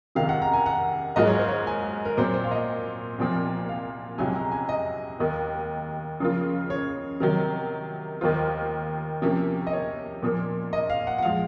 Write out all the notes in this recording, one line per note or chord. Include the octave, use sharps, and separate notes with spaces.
C#2 C3 D#3 F5
F#5
A#5
G#5
F#5
G#2 F#3 A#3 F4 G#4 D#5
C#5
C5
C#5
G#5
A#4
A#2 F#3 C4 C5
C5
F5
D#5
C2 A#2 F3 C4
F5
C#2 C3 F#3 G#5
A#5
G#5
D#5
D#2 D#3 A#3
C#3 F3 A#3 F4
C#5
C3 D#3 F#3 A#4
D#2 D#3 A#3 F4 C5
C3 F3 A#3 C#4
D#5
C#5
A#2 F3 A#3
D#5
F5
F#5
F#5
F3 G#3 F5